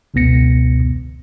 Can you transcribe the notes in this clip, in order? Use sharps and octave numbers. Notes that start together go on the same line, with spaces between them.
G1 C#2 B2 B3 A#6 C#7